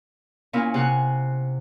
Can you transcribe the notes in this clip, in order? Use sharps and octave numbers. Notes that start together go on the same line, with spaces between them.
A#2 C#4 E4 F6
C3 F#5 G#5 F#6